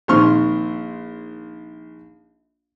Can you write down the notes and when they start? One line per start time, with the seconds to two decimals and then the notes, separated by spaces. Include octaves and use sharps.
0.08 A#1 D#3 C4 C6 C#6 F6